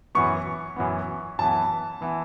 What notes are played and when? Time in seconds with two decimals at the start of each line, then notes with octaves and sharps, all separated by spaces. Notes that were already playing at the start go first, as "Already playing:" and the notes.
0.15 F#2 E3 B3 C#6
0.76 F#2 E3 B3
1.39 F#2 E3 B3 A5
2.01 E3 B3